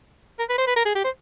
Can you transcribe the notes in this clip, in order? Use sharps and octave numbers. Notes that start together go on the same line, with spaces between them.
A#4
B4
C5
B4
A#4
G#4
G4
C5